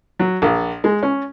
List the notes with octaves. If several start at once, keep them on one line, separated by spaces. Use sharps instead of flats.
F#3
A#1
G#3
C#4